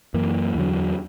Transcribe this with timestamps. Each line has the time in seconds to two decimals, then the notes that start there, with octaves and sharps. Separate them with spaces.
0.14 F#2 E3 A#3
0.55 E2 D3 F#3